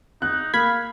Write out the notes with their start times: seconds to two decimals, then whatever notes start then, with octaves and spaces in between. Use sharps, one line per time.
0.22 D#4 F#6
0.54 A#3 F5 B5 G#6